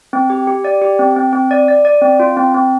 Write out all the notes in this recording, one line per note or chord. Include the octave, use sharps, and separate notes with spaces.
C4
G4
G4
D5
G4
C4
C4
C4
D5
D5
D5
C4
F4
C4
C4